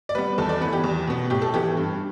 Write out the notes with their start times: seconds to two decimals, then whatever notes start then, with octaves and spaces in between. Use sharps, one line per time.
0.09 D5
0.15 G3 B3 B4
0.38 E2 A4
0.49 D5
0.61 E3 B3 B4
0.73 G4
0.84 E2
1.07 B2 B3
1.30 A2 G4
1.42 A4
1.54 E3 B3 G4
1.77 G2